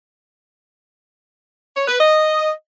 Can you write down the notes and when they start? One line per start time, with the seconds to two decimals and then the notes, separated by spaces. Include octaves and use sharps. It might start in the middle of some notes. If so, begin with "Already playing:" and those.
1.76 C#5
1.88 B4
2.00 D#5